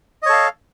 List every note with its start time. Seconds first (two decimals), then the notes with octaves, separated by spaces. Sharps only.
0.23 D#5
0.26 C#5
0.29 A4
0.33 F5